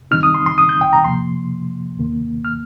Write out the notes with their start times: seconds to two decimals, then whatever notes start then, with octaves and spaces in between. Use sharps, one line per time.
0.11 G2 D#3 G3 C4 D#4 F6
0.23 D#6
0.34 C6
0.46 C6
0.58 D#6
0.69 G6
0.81 G5
0.93 A#5
1.04 C3 F3 A#3 C6
1.97 D#2 D#3 A#3
2.45 F6